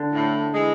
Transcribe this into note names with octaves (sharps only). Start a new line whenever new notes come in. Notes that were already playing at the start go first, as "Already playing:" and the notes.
Already playing: D3
A2
E3 G#3